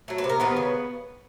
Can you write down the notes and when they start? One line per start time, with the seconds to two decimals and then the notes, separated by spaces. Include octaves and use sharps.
0.08 F#3 A3
0.18 B4
0.24 C3
0.29 A#4
0.40 D#3 G3 B3 B4
0.57 C#3